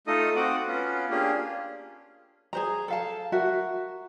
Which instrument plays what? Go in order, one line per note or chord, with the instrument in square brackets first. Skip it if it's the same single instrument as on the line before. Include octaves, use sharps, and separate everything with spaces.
[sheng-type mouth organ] A3 D#4 F4 A4 D#5 D#6
C4 F#4 F#5 D6 D#6
B3 C#4 F4
A#3 C#4 D4 F4 G4 G#4
[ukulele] G#4 C5 A#5
A4 F5 A5
F#4 A#4 E5